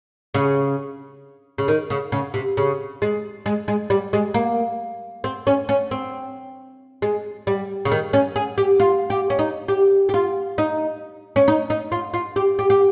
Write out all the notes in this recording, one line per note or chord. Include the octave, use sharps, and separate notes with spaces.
C#3
C#3
D#3
C#3
C#3
C3
C#3
G#3
G#3
G#3
G3
G#3
A#3
C4
C#4
C#4
C4
G#3
G3
C#3
D#3
C#4
G#4
G4
F4
G4
C#4
D#4
G4
G4
F4
D#4
C#4
D#4
D#4
F4
F4
G4
G4
G4